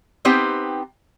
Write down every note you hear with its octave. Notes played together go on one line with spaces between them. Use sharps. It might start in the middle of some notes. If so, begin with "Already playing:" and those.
B3 C4 D#4 G4 C5 G5